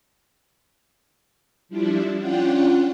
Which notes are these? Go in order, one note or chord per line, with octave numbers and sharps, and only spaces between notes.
F3 G3 D4 E4
C#4 D4 F4 F#5 G5